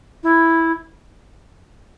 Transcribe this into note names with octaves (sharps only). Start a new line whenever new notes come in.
E4